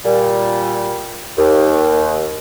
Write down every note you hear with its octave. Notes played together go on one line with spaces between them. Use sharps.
A#2 G3
D#2